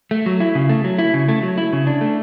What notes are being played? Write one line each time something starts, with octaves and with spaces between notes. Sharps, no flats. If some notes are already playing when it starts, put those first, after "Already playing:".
A3
F#3
E4
C#3
A3
F#3
E4
C#3
A3
F#3
E4
C#3
D4
A3